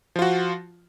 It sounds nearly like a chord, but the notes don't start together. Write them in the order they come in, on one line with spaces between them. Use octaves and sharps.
F3 F4 F#4